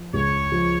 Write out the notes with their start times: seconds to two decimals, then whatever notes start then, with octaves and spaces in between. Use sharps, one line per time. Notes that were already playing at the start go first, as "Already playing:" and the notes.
Already playing: F3
0.14 C#2 C#5
0.52 F3